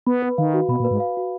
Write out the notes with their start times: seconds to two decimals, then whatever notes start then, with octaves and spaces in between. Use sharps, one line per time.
0.07 B3 B5
0.22 B4
0.38 D#3 F5
0.54 F#4
0.69 B2 B5
0.80 A#2
0.84 B4
0.91 G#2
1.00 F5
1.17 F#4